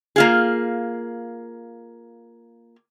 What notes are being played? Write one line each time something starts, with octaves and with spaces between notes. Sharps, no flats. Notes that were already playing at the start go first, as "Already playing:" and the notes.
A#3 F4 G#4